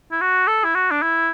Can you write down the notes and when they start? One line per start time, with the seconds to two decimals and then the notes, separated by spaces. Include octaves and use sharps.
0.12 E4
0.21 F#4
0.48 A4
0.64 E4
0.75 F#4
0.91 D4
1.02 E4